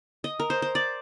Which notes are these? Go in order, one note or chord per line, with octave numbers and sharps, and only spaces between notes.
D#5
A#4
C5
C5
D5